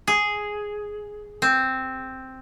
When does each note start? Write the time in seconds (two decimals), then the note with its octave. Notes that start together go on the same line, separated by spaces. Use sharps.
0.08 G#4
1.42 C4